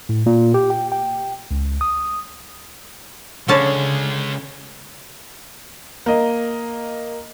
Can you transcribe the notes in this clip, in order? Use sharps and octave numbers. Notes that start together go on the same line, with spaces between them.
A2
A#2
G4
G5
G5
C#2
D#6
C#2 D3 G#3 C#4 A5
A#3 D#5